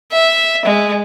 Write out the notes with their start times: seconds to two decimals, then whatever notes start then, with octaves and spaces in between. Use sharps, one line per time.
0.11 E5
0.65 G#3